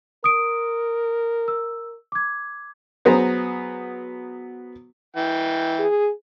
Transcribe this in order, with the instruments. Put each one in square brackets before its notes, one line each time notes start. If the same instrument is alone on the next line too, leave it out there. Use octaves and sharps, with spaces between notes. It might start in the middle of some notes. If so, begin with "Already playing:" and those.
[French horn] A#4 [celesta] D#6 D7
[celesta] E6
D6 G#6
[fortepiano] F#3 B3 G#4 C5 A#5
[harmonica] E3 G5
[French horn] G#4